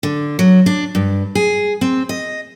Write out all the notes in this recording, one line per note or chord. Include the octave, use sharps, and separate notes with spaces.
D3
F#3
D4
G2
G#4
C4
D#5